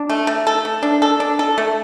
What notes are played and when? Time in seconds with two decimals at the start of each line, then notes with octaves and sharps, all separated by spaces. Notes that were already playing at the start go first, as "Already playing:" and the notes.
Already playing: D4
0.10 A3
0.27 A3
0.47 A4
0.65 A3
0.83 D4
1.02 A4
1.20 D4
1.39 A4
1.58 A3